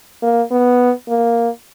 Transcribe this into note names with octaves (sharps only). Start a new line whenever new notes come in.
A#3
B3
A#3